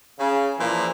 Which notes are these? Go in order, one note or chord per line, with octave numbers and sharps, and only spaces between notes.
C#3
A#2 E3 F3